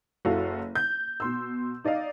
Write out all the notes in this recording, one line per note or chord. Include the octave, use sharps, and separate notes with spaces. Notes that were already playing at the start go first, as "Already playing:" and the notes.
F#1 E4 F#4 A4 F5
G6
B2 C6 E6
D#4 D5 D#5 F5